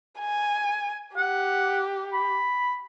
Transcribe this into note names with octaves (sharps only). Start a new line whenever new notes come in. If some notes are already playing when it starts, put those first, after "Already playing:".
G#5
G4 F#5
B5